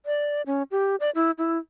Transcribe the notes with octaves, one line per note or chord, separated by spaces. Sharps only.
D5
C#4
G4
D5
E4
E4